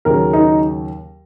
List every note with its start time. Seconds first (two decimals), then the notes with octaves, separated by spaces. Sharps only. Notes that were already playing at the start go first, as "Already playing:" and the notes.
0.05 D#2 C#3 F#3 A#4
0.33 D#4